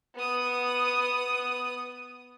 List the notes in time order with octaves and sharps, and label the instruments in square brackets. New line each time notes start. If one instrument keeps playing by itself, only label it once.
[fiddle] B3 D#6